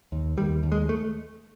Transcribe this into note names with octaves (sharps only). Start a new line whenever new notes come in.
D#2
D#2 G3
D#2
G#3
A3